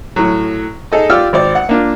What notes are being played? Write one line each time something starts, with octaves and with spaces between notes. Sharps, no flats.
A2 F#3
D#4 G#4 A4 D#5
F4 G4 D5 E6 F6
G#1 C5 D5
F#5
A#3 D4 F4